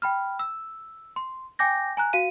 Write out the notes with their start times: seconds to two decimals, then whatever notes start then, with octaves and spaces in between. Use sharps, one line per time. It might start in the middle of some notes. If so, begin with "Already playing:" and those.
0.02 G5 B5 F6
0.39 E6
1.16 C6
1.59 G5 G#5 D6 G6 A#6
1.97 G#5 A#5 F#6
2.13 F#4 F5 D#7